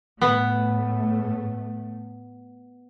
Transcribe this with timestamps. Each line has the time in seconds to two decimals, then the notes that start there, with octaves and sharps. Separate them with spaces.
0.21 A2 A3 B3